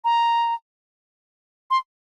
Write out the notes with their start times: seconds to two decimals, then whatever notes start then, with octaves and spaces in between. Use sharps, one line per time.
0.05 A#5
1.71 C6